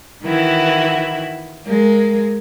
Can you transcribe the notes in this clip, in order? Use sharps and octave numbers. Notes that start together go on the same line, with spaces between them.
D#3 E3 E4 F#4
G#3 A#3